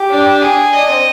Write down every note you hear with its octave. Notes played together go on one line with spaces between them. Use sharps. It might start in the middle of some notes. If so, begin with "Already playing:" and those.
Already playing: G4
D4
G#4
D4 D#5
C4